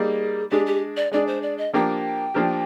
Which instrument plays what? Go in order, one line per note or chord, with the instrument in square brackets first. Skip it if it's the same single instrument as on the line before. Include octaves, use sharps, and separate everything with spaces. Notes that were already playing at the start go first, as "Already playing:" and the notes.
Already playing: [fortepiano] G3 A#3 D#4 [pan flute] G#4
[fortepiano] G#3 D4 G#4 [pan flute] G4
[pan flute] G4
D5
[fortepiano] G#3 D4 G#4 [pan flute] D5
[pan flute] C5
D5
D#5
[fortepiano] F3 A#3 D4 G4 A#4 [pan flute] G5
[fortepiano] F3 A#3 D4 G4 A#4